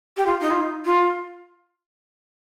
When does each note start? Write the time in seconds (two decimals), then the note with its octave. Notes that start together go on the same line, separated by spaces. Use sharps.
0.17 G4
0.26 F4
0.41 D#4
0.50 F4
0.60 D#4
0.85 F4